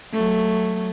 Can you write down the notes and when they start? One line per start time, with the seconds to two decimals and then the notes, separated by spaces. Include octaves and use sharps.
0.13 F#3 A3